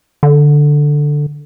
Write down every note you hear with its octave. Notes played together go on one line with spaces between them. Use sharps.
D3